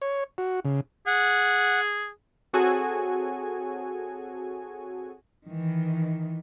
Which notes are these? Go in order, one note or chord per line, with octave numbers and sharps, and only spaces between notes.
C#5
F#4
C#3
G#4 F#5
C4 F#4 G#4 A4 C#5 G#5
D#3 E3